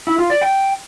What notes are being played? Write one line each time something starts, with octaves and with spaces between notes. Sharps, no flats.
E4
F4
D5
G5